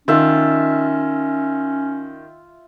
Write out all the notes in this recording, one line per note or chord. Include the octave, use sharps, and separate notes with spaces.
D#3 C#4 F4 E5